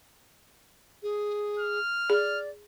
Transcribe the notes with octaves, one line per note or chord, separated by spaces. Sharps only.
G#4
F6
G#4 D5